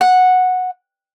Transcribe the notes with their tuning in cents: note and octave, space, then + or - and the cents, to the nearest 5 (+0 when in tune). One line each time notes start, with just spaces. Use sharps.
F#5 -10